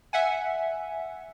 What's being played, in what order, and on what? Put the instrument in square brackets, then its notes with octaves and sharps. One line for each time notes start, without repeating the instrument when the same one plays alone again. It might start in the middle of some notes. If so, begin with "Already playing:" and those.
[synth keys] E5 F#5 G#5